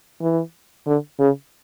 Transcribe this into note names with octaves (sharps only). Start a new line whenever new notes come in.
E3
D3
C#3